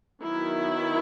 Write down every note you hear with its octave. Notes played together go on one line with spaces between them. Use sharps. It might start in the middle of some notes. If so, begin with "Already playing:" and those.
D#3 F#3 B3 E4